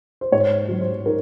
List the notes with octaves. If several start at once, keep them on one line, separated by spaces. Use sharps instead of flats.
C5
G#2 C#5
F#3
C5
D#4 A#4